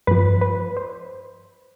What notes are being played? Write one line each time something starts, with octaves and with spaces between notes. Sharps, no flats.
G2 F3 B4
B4
C5